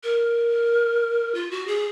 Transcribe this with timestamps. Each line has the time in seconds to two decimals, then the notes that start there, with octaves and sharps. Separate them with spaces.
0.03 A#4
1.35 F4
1.51 F#4
1.67 G#4